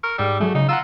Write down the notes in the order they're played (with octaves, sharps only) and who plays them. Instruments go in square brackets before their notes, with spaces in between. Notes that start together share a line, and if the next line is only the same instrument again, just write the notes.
[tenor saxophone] A#4 [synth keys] C#6
[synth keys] G#2 E6 [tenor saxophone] G3
[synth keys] F#3 G#3 [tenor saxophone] A3
[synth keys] C#3 [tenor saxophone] D#4
[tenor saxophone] F4 [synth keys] F#5 A#5 E6